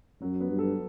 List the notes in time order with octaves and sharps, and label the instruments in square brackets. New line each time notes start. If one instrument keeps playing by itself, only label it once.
[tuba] F#2 [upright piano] F#3
[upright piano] B3
[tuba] G2
[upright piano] A4